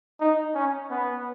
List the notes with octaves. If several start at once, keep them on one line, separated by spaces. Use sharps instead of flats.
D#4
C#4
B3